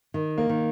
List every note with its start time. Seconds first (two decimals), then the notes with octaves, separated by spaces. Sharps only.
0.14 D#3
0.38 A#3
0.49 D#3